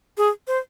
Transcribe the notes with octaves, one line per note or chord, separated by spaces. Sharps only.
G#4
C5